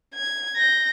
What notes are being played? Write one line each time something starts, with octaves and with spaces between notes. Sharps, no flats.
G#6
G6 A#6